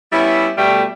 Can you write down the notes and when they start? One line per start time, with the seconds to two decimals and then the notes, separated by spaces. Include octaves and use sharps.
0.12 G3 B3 C#4 E4
0.58 B2 G3 A3